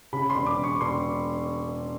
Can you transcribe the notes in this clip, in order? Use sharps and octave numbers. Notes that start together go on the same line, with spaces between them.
C#3 B5
C6
E1
D6
E1
C#6
E1 C6